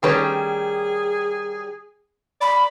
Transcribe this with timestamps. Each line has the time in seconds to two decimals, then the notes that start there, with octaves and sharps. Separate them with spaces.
0.03 D#3 G3 A3 C#4 G#4 B4 C#5
2.41 D5 B5